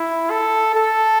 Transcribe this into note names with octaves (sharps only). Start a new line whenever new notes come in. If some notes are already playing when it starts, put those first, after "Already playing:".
Already playing: E4
A4
A4